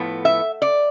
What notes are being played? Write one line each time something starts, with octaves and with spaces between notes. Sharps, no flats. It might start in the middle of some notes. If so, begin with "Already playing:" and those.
Already playing: A2 F3 B3
E5
D5